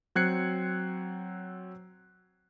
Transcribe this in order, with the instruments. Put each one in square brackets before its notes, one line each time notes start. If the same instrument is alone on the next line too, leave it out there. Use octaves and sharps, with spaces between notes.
[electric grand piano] F#3 C4 F#6 G#6 C7 C#7